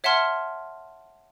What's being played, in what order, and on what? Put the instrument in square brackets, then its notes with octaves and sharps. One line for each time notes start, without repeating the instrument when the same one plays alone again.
[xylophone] C#5 E5 F#5 A5 C6 F6